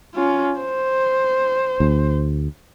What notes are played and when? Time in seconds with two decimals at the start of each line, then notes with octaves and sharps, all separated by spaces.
0.14 C#4 F4
0.60 C5
1.80 D2